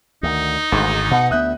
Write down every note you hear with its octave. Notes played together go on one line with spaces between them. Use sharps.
D2 D#3 D#4
G#1 D2 G#2
B2 F#5
D2 B3 E5 D#6 F#6 G6